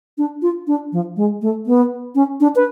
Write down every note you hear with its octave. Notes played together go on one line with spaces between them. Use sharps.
D4
F4
D4
F3
G#3
A3
B3
C#4
D4
B4